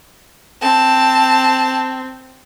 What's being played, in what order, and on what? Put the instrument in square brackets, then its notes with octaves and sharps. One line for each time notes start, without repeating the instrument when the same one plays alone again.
[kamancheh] C4 [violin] A5